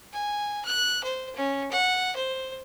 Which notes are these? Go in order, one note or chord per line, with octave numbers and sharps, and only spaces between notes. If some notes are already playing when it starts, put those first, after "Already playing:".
G#5
F#6
C5
C#4
F#5
C5